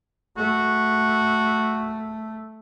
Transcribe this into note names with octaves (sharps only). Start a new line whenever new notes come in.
A3 F#4